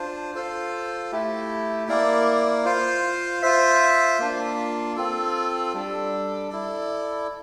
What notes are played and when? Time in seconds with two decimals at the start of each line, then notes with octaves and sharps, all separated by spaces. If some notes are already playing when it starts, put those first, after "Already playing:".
Already playing: D4 F4 C5
0.35 F4 A4 C5 F5
1.12 A3 E4 G4
1.88 A#3 E4 A#4 D5
2.65 F4 C5 F5
3.42 F4 C5 E5
4.19 A#3 D4 F4
4.96 C4 F4 A4
5.74 G3 D4 A4
6.50 E4 A4 D5